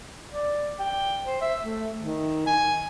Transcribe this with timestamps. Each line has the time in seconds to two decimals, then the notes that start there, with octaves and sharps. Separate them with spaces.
0.32 D5
0.79 G5
1.26 C5
1.41 E5
1.63 A3
2.01 D#3
2.47 G#5